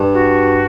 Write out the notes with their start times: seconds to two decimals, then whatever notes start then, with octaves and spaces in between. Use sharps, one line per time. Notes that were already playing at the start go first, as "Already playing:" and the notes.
Already playing: G2
0.13 F#4